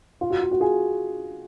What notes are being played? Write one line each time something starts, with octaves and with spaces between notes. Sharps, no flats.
F4
F#4
F4
F#4
F4 G#4